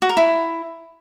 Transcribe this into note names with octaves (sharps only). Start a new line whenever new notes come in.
F#4
A#4
E4